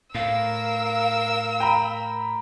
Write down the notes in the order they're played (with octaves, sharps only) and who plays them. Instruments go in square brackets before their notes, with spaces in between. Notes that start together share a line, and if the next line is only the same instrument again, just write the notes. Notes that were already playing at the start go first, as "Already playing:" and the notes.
[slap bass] A2 [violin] A#4 E6 [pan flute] F5
[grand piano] G5 A#5 B5